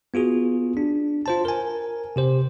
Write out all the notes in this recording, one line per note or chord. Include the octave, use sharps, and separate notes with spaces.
B3 F4 F#4 G#4
D4
F4 C5 A5
A#4 G#5
C3 G4 C5